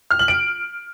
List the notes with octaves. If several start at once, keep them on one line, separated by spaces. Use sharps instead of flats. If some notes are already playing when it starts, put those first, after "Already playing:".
F6
F#7
D7